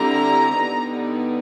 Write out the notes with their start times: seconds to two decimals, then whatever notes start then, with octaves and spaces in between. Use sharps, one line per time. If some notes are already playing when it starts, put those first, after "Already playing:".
Already playing: D3 G3 C4 E4 A#5
0.52 D3 G3 B3 D#4